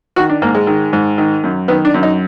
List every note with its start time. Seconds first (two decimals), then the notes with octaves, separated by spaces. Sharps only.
0.16 D#3 F#4
0.29 D4
0.42 G#2 A#3
0.55 G#3
0.67 D#3
0.93 G#2
1.18 D#3
1.44 F#2
1.68 D#3 B3
1.85 D4
1.94 F#2
2.03 D#4